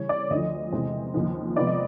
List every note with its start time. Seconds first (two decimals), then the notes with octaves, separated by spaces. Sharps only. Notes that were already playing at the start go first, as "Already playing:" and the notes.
Already playing: C#3 E3 G3 C#5
0.09 D5
0.30 D2 D3 F3 D#5
0.72 E2 C3 E3 G#3 C4
1.14 D#2 C#3 F3
1.56 C3 F3 G#3 B3 D#4 D5
1.67 D#5